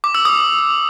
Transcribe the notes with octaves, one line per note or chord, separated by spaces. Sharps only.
D6
E6
D#6